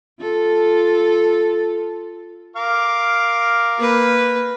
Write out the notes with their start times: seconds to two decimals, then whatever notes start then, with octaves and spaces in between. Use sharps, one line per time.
0.21 F4 A4
2.56 A#4 F5 D6
3.78 A#3 B4